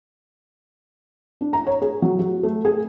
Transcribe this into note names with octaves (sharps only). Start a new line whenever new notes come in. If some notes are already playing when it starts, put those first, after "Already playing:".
D4
A#5
C#5
G#4
F#3
F#4
A3
G#4